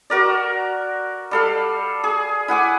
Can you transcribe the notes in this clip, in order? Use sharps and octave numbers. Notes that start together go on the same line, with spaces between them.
F#4 A#4 D5
G3 A4 F5
G#4
E4 F#5 G#5 D6